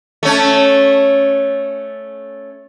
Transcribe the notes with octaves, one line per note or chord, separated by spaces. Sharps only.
A3 C#4